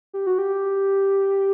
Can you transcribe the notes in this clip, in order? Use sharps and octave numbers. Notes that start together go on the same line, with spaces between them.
G4
F#4
G4